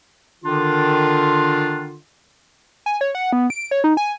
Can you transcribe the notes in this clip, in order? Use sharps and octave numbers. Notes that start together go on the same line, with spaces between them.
D3 D#3 D4 F4
G#5
C#5
F#5
B3
D7
C#5
D#4
G#5